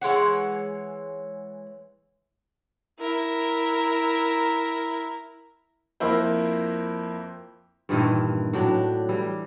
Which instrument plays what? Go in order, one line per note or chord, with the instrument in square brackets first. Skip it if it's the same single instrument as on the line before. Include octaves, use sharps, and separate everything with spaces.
[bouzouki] E3 G#3 C#5 F#5
[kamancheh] E4 A#4
[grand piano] F2 A#3 E4 C5
[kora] G2 A#2 D#3 E3
A2 F#3 D4
E3 G3